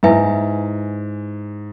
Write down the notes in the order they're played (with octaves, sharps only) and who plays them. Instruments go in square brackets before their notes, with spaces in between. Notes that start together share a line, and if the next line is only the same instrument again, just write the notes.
[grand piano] G#2 [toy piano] E4 B4 E5 G#5